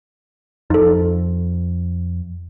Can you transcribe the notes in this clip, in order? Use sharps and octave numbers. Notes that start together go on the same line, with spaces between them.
F2 D#4 A4